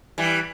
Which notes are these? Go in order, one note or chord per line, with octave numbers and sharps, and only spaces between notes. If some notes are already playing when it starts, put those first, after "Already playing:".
E3 G3